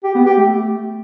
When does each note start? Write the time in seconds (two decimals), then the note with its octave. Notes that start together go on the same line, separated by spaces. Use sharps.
0.04 G4
0.15 B3
0.26 G4
0.37 A3